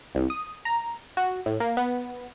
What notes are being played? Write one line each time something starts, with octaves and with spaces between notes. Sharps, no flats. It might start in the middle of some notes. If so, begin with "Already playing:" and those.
C2
D#6
A#5
F#4
A2
A#3
B3